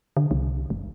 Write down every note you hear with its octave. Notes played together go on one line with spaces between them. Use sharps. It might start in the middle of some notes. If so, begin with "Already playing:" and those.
D3
C2
F#1